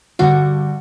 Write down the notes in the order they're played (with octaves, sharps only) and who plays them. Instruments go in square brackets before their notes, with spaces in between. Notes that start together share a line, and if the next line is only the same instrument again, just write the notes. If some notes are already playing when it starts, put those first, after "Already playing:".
[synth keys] G2 D3 G3 [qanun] F#4